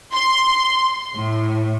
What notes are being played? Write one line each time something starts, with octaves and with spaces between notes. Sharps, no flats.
C6
A2